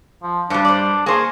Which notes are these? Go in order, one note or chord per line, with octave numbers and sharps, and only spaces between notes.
F3
G2 G3 D4 C5 C#6
C5 D5
A#3 G#4 C5 G#5 C#6